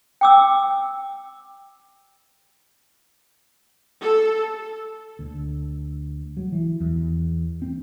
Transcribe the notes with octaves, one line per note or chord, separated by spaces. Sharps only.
G5 D6 E6
A4
D2
F#3
E3
E2
C4